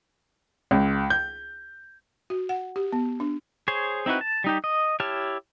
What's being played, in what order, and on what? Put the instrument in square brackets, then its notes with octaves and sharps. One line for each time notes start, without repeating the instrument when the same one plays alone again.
[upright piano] C#2
G6
[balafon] F#4
F#5
G4
B3
D4
[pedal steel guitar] G#4 C5 C#5
C4 D#4 E4 F#4 B4
A5
G3 D#4 G4
D#5
E4 G4 C#5 A5 F6